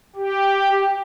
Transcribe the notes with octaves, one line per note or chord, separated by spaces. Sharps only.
G4